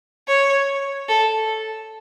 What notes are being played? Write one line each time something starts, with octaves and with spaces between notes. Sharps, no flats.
C#5
A4